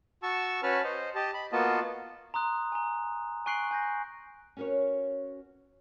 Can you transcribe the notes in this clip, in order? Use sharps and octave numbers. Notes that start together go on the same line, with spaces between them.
F#4 A5 C#6 E6
C#4 F#4 B4 A5 F6
C5 D#5
G4 D#5 A5
B5
A#3 B3 F4 F#4 D#5 A5
A#5 C6 D#6 F#6
G#5 A#5
G#5 C#6 F#6 C7 D7 F#7
G#5 G6 A#6
C#4 F#4 A#4 B4 C#5